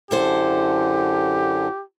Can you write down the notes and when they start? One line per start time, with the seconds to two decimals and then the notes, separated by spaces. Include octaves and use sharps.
0.11 F#2 D3 E4 G4 A4 C5